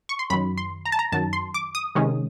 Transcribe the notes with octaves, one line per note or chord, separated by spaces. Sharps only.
C#6
C6
F#2 D#3 F#3 B5
C6
A#5
A5
A#5
F#2 D#3 F#3 A5
C6
D6
D#6
C3 D#3 G#3 C#4